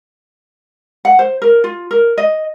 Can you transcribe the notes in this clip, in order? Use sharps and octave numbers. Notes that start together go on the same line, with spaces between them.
F#5
C5
A#4
F4
A#4
D#5